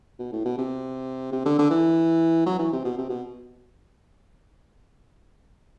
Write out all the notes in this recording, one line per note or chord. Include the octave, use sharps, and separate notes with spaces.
B2
A2
B2
C3
C3
D3
D3
E3
F#3
E3
C3
B2
C3
B2